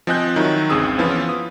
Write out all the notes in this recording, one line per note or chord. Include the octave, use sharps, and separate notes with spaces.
F3 C4 D#5 G#5 F#6 G6
D#3 F#3 D#4 E4
G1 C#2 C4 G#4 D#6 E6
E3 F3 B3 C#4 E4 F4
D#6